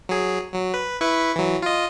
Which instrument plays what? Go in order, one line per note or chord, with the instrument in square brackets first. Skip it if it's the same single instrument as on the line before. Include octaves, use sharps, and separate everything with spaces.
[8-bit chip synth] F#3 G#4
F#3
B4
E4 B4 C#6
E3 F#3
F4 D#5